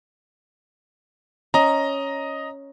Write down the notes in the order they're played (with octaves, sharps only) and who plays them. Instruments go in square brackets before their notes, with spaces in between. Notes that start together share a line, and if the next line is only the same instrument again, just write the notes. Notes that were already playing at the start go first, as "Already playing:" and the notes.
[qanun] C#4 [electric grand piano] D#5 A#5